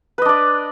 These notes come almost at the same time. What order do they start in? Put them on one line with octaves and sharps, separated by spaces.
B4 D#5 D4 D5